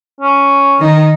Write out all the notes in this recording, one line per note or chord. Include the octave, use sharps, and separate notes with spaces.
C#4
D#3 D#4